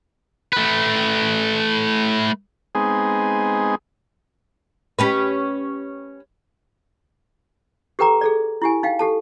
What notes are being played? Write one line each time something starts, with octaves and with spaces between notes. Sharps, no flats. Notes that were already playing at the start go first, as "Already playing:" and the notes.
A3 B4
G#3 B3 C4 D#4 G#4
C#4 G4 B4
G4 A4 B4 G5 A#5 D6
G#4 A4 D5
E4 G4 G#5
D#4 F5 G5
G4 A4 A5